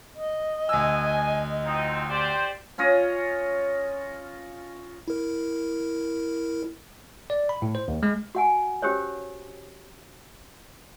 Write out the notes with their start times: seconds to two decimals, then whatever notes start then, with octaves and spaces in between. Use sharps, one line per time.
0.15 D#5
0.69 D2 G#5 E6
1.64 F3 C4 D#4
2.09 G4 C5 D5
2.78 C#4 F4 C#5 D#5
5.08 E4 A#4
7.30 D5
7.49 B5
7.62 A2
7.75 C5
7.88 D#2
8.03 G#3
8.35 F#4 F#5 G#5
8.82 C#4 F#4 G4 A#4 C5 C#5